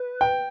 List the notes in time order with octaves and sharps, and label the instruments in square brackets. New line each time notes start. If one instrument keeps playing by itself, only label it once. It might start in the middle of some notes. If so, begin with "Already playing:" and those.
Already playing: [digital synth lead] B4
[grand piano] G5